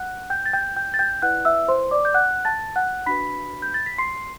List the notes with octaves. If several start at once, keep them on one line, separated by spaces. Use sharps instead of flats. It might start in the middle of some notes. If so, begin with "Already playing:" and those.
Already playing: F#5 F#6
G5 G6
A6
G5 G6
G5 G6
A6
G5 G6
E4 B4 D5 F#5 F#6
E5 E6
C5 C6
D5 D6
G6
F#5 F#6
A5 A6
F#5 F#6
D4 F#4 B4 B5 B6
G6
A6
B6
C6 C7